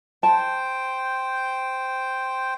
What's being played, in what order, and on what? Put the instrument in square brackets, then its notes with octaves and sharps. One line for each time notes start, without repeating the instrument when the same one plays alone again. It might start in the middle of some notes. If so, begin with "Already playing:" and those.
[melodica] C5 G5 [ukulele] A5